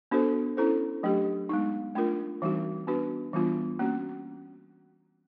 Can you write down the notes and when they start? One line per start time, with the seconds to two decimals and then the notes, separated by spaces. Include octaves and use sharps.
0.11 B3 D4 F#4 A4 C5
0.57 C#4 E4 A4 C5
1.03 F#3 A3 D4 G4
1.49 G#3 B3 D#4
1.95 A3 D4 F4 A#4
2.42 E3 G3 C4 D#4 F#4
2.87 B3 D4 F#4 B4
3.33 E3 G3 B3 D4 F4
3.79 A#3 C#4 F#4